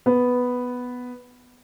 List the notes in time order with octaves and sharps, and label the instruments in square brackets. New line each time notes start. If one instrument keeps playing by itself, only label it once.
[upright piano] B3